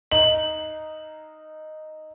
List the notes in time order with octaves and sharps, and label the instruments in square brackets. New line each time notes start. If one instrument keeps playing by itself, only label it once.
[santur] D#4 [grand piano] F#7